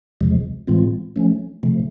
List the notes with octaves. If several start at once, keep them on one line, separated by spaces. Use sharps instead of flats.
E2 C3 F3 G#3
A2 E3 G#3 C4 F4
F3 A3 C#4
C3 F3 A3